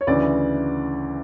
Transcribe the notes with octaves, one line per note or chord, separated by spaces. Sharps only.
C#5
D2 C#3 E3 D5